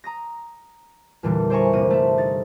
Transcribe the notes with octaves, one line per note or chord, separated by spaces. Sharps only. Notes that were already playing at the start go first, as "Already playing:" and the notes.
A#5 D#6 A#6
E2 A#2 D3 E3 G3
C5 D5 E5 G#5 A#5 C#6
G1 C3 A#3 C4 D#7
A3 E4 E5
D#4 A6